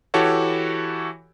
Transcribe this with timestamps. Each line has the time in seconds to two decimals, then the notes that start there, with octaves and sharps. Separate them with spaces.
0.14 E3 E4 F#4 G4 A4 C#5